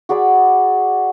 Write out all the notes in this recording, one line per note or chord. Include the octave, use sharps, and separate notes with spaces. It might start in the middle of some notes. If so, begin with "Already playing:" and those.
F#4 G#4 D5 B5